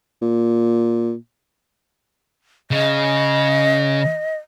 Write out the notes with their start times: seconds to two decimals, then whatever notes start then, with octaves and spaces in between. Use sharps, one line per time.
0.22 A#2
2.71 C#3 D#5